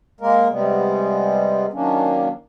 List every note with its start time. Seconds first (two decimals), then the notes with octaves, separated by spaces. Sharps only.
0.21 G#3 A#3 A#4
0.51 C3 G3 G#3 B3
1.73 D#3 F#3 A#3 C#4 D4